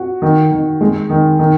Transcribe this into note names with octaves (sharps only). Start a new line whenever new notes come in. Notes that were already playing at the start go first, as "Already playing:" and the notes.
Already playing: F#4
D#3
D#3
G#3
D#3
D#3